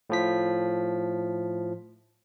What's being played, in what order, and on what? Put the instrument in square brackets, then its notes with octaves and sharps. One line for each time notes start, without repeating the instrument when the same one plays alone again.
[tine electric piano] A2 F3 B6